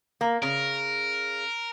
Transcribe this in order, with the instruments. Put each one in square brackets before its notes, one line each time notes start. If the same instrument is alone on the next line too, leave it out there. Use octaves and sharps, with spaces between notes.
[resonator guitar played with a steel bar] A#3
[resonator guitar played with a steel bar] C#3 [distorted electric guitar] A#4